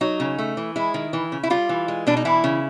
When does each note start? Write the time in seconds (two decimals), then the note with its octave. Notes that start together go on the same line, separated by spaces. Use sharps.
0.01 F#3 D#4
0.20 C#3
0.38 A3
0.57 E3
0.76 G#3 E4
0.94 D#3
1.13 E3
1.32 C#3
1.43 E4
1.50 G3 F4
1.69 E3
1.88 G#3
2.07 B2 D4
2.17 D#4
2.25 E3 E4
2.44 C#3